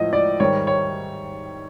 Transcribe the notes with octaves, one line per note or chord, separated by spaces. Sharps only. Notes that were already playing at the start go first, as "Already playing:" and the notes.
Already playing: A2 F3 D#5
D5
G#2 D#3 G3 C#5
C#5